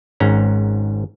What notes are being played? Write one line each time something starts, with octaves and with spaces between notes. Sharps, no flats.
G#1 G#2 C#4 A#5